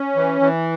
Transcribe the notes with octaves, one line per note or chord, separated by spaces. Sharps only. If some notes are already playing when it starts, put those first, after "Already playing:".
Already playing: C#4
E3
E3